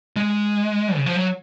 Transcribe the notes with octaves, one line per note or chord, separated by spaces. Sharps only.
G#3
C#3
F3
F#3